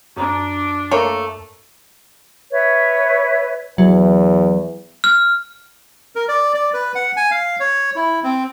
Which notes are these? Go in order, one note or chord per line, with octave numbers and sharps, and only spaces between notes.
F#2 D4 A#5
A3 A#3 C#5
B4 C#5 E5
E2 F#3
F6
A#4
D5
D5
B4
F#5
G#5
F5
C#5
E4
C4